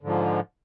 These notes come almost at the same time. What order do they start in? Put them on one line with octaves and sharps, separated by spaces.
D3 G#2 F3